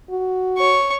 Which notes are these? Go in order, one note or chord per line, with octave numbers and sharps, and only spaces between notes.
F#4
C#5 C#6